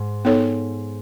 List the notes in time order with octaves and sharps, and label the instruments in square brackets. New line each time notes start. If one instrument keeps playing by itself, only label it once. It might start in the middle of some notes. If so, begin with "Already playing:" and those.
Already playing: [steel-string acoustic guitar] G#2
[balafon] B3 D#4 A4 C#5